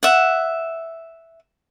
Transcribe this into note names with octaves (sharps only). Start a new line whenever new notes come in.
E5 F#5